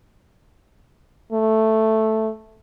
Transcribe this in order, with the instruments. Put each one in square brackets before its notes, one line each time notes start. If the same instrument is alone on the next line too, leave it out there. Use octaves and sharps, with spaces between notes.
[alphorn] A3